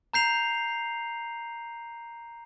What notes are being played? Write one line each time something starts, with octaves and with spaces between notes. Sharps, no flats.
A#5 G6 C7 F7